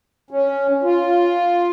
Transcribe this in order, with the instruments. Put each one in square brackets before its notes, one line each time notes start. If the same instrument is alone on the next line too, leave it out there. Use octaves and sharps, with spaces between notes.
[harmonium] C#4
F4